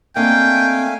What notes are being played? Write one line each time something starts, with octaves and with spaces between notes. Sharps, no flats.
A3 A#3 C4 D4 D#5 F5 G5 G#5